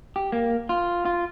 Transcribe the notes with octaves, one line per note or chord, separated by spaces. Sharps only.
G4
A#3
F4
F4